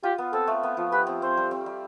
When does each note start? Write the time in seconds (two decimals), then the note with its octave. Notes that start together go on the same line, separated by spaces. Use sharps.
0.03 F4 G4
0.18 B3
0.33 C4 A4
0.48 A3
0.63 B3
0.77 F3
0.92 G4 B4
1.07 C4
1.22 C4 C5
1.37 G3
1.51 C4
1.66 G3